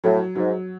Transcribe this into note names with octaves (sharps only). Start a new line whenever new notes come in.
A2 F#3
G#2 F#3